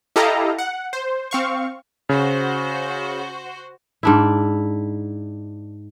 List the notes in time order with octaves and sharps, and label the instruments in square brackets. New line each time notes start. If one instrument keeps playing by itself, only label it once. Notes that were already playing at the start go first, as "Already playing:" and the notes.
[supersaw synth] E4 G4 A4 D#5 F5 A#5
F#5
C5
C4 F5 C#6
[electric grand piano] C#3 [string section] F#4 C5
[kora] G#2 D4 E4